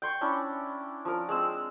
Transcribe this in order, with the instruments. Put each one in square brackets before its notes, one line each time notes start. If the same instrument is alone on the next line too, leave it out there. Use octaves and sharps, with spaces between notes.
[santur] G5 C6 C#6
C#4 D4 E4 B5
F3 A#4
G#3 C4 E6